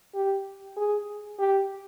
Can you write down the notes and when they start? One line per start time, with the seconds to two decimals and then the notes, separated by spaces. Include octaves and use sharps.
0.15 G4
0.77 G#4
1.39 G4